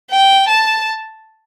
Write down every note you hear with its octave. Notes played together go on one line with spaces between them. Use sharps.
G5
A5